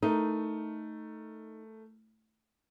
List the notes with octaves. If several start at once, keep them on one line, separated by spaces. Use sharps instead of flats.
A3 D#4 A#4